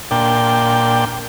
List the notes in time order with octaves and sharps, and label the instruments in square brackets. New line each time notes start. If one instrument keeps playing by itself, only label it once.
[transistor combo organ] A#2 D4 G5